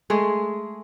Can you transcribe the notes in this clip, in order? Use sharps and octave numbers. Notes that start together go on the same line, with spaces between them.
G#3 A3 G#4